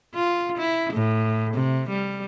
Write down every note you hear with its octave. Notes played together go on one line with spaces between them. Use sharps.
F4
E4
A2
C3
G3